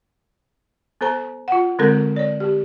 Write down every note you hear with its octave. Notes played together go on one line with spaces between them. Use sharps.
B3 A4 C5 A#5
F4 F#5
D3 G#3 C4 A4 A#4
C#5 D5
G4